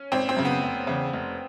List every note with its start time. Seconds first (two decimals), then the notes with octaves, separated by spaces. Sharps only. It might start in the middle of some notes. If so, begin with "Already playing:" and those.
Already playing: C#4
0.12 G#1 C4
0.29 C4
0.37 F#2 C#3
0.45 B3
0.63 F1
0.87 E2 C#3
1.13 F1